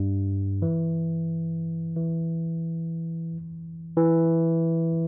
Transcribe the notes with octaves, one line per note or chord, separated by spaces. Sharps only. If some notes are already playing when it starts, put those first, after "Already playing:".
Already playing: G2
E3
E3
E3